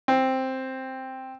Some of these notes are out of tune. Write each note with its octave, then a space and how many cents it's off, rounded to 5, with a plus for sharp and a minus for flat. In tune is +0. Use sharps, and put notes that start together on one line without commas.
C4 +5